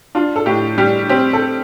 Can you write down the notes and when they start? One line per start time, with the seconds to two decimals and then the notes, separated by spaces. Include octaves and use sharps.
0.15 D4 F4
0.36 A4
0.46 A2 G4
0.78 G3 G4
1.09 C4 G4
1.33 A4